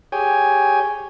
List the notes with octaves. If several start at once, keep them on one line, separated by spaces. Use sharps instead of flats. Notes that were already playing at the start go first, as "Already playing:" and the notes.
G4 G#4 C#5 G5 G#5